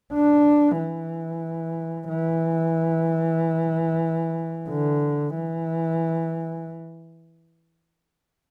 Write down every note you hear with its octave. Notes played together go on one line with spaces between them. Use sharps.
D4
E3
E3
D3
E3